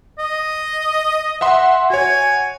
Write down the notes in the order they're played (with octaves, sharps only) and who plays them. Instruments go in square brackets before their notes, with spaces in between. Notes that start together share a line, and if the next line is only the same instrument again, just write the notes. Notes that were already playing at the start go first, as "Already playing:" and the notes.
[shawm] D#5
[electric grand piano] E5 F#5 C6
[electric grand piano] F#4 C#5 [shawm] G#5